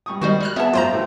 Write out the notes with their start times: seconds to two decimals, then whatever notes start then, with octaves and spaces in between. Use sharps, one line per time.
0.06 G2 C#6 D#6
0.22 D#3 G3 F#4 C5 D#5
0.41 G3 F6 F#6
0.56 B3 G#4 B4 E5 F#5 A5
0.73 F#2 A2 F4 C5 A#5
0.92 A1 A2 E3